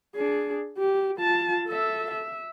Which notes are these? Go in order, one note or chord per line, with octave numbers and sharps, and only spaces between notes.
D4 G#4
G4
F4 A5
A4 E5
E5